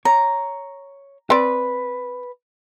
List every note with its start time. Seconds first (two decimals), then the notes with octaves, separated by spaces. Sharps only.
0.05 C#5 A#5
1.30 C4 B4 D5